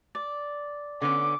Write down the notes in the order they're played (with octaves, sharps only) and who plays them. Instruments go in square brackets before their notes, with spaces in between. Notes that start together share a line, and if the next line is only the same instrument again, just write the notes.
[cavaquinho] D5
[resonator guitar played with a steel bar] D3 B3 C#4 [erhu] D6